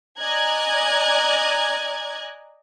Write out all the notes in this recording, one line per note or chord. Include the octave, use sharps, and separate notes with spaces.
D5 D#5 G#5 A#5 F#6 G#6